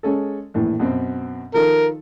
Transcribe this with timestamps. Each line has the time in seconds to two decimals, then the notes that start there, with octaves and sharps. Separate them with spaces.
0.03 G#3 C#4 A4
0.54 A#1 A2 E3
0.80 F#2 B2 C4
1.54 D#3 F3 A4 A#4